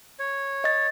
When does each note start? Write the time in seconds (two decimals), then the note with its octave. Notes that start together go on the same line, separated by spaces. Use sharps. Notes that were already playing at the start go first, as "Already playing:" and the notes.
0.19 C#5
0.64 D#5 A6